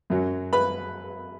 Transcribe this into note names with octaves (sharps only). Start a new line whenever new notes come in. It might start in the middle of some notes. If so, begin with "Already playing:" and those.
F#2 F#3 C#4
B4 B5